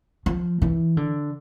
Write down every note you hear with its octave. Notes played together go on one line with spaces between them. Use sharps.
F3
E3
D3